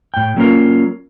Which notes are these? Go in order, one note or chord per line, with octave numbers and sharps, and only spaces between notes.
A2 G5
F#3 A3 A#3 C#4 F4 A#4